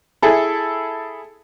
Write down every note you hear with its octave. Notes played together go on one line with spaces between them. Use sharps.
E4 G#4 A4